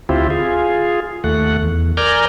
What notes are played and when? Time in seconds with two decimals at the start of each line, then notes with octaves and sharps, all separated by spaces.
0.09 D2 C4 E4 F4 G4
0.30 F4 G#4
1.24 D#2 A3 F#5
1.63 E2
1.97 A#4 D5 G#5 A#5 F6 G6